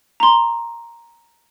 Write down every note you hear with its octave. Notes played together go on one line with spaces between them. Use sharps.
A#5 C6